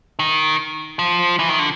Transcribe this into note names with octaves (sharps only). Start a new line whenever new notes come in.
D#3
F3
E3
D#3
D3